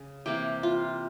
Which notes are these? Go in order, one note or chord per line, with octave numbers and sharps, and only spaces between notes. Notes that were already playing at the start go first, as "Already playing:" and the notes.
Already playing: C#3
C3 E3 A#3 G4
F4